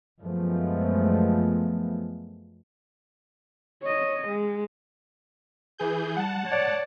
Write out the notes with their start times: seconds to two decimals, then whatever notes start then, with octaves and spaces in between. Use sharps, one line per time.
0.21 F#2 F3 G#3 A3 B3
3.83 C#5 D#5
4.28 G#3
5.78 E3 G#4 G6
6.16 G3 F#5 A5
6.47 C#5 D5